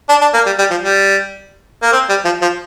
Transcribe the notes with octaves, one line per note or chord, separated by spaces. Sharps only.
D4
D4
A#3
G3
G3
F3
G3
A#3
C4
G3
F3
F3